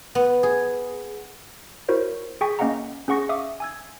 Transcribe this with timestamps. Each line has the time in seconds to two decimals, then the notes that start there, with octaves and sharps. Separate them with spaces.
0.15 B3
0.43 G#4
1.89 E4 F#4 A#4 C5 C#5
2.41 G#4 G5 G#5 C#6 B6
2.59 A#3 C#4 D#5 F5 F#5 A#5
3.08 C#4 G#4 F#5 C#6 A#6 C#7
3.29 E5 F5 D6 D#6
3.60 G#5 E6 G#6